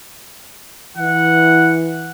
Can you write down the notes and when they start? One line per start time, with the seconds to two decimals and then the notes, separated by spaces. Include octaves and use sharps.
0.97 E3 F#5